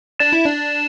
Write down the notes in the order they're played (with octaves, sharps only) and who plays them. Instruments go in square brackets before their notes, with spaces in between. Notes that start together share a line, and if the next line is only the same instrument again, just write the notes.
[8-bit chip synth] D4 [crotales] A6 E7
[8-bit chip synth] E4
D4